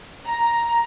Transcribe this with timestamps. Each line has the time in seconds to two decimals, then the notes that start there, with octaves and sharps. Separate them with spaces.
0.24 A#5